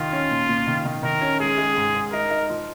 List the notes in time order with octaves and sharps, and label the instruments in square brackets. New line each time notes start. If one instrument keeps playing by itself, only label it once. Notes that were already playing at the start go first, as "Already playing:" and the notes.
Already playing: [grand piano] D#3 [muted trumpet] F4
[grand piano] C#4
A#2
A#2
D#3
D#3
[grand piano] D#3 [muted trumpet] A#4
[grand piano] C#4
[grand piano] G#3 [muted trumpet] G#4
[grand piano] G#3
G#2
G#2
[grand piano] D#4 [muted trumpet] A#4
[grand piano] D#4
F3